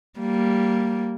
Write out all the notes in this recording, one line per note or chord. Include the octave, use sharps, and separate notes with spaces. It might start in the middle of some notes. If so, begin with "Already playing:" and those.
G3 A#3